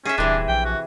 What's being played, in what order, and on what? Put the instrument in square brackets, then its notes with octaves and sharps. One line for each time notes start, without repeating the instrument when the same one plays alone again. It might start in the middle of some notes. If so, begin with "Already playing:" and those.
[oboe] C#4 [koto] G#4 E5
[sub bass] D#1 [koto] C3 E3 [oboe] D4
[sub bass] A#1 [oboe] G5
[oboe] F#4